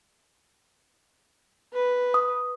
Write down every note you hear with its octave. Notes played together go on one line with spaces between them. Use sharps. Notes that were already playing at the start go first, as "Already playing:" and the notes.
B4
D#6